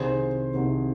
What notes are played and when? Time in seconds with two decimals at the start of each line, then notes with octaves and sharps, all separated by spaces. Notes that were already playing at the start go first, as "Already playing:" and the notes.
Already playing: C2 C3 D#3 G#4 C5
0.54 C2 C3 D#3